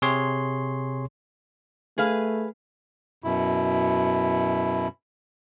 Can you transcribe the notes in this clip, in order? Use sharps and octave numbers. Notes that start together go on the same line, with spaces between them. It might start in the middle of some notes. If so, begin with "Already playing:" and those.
C3 G#4 C#5 C6
A3 G#4 B4 F5
F#2 B2 E4